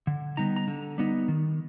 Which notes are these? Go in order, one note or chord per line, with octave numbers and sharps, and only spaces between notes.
D3
G3 B3 D#4 A#5
A#5
D3
G3 B3 D#4
D#3